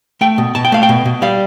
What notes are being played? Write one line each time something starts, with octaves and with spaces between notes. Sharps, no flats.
A3 G5
B2
B2 A5
G5
A3 F5
G5
B2
B2
G3 F5